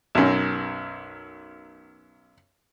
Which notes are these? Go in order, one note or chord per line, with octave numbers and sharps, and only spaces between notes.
B1 F#2